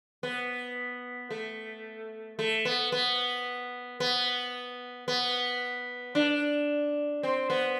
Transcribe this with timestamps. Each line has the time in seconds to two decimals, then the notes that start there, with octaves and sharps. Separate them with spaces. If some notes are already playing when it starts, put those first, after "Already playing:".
0.23 B3
1.30 A3
2.39 A3
2.65 B3
2.92 B3
4.00 B3
5.08 B3
6.15 D4
7.23 C4
7.50 B3